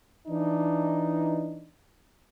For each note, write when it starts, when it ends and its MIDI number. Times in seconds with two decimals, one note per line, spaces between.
0.28 1.70 52
0.28 1.70 62
0.28 1.70 63